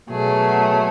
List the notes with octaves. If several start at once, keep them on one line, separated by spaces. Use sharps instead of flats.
B2 F#3 A3 G#4